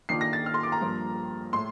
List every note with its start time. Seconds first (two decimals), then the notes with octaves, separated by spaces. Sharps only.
0.09 D#3 A#3 D4 F4 C7
0.21 A#6
0.33 A6
0.46 F6
0.54 C6
0.63 D6
0.72 A#5
0.81 G2 F3 A#3
1.53 A2 A3 C6